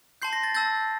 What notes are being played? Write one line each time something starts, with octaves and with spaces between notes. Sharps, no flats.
A5 C6 G6 C7
A#6
A6
A5 E6 G6 A6